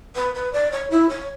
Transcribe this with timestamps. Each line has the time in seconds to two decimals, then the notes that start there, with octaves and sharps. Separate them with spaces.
0.16 B4
0.35 B4
0.53 D5
0.72 C#5
0.90 E4
1.09 C#5